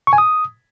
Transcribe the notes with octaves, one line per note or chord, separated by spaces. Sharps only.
C#6
G#5
D#6